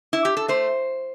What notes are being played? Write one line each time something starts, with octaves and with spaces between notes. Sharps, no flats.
E4
G4
A4
A3 C5